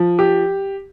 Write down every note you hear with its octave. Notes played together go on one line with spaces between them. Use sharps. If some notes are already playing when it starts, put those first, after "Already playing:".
Already playing: F3
G4